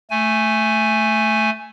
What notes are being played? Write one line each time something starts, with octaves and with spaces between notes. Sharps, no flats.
A3 G#5